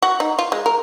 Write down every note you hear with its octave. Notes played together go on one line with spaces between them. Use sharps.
F#4
D#4
F4
G#3
A#4